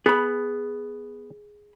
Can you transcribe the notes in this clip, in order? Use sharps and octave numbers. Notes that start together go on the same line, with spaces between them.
B3 G#4 B5